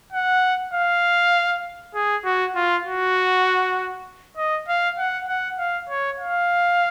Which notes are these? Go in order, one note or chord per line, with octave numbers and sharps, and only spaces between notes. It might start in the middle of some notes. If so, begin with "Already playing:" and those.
F#5
F5
G#4
F#4
F4
F#4
D#5
F5
F#5
F#5
F5
C#5
F5